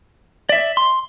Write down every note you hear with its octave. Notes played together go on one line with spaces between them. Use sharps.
D5 E5
C6